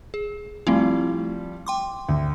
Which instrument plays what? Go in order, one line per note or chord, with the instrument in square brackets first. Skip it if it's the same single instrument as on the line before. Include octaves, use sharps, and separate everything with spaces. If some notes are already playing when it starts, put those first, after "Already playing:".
[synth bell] G#4
[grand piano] F3 G3 [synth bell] A3 C4 E4
[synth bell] G5 C6 D6
[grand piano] D2